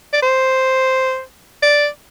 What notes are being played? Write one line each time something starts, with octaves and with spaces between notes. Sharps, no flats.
D5
C5
D5